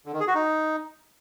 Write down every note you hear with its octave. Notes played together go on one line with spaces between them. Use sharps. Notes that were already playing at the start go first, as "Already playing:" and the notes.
D3
D#3
G#4
F#4
D#4